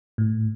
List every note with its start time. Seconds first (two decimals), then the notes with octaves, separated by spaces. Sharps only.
0.18 A2